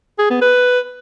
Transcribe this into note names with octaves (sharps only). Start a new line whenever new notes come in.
G#4
B3
B4